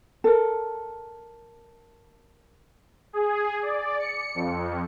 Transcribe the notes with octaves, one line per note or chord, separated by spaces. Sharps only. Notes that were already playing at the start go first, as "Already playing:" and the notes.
A4 A#4
G#4
D5
C#7
F2